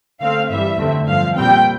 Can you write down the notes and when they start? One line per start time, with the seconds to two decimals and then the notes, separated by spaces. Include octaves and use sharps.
0.20 D3 A3 C4 F5
0.50 G2 E3 G3 E5
0.78 F2 D3 A3 C4
1.07 G2 D3 F3 F5
1.35 A#2 G3 C4 G5